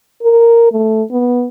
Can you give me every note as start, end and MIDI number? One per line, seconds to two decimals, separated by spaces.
0.22 0.68 70
0.72 1.03 57
1.11 1.49 59